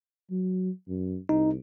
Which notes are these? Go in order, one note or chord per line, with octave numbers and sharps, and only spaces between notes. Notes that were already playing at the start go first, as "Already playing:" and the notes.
F#3
F#2
C2 D#4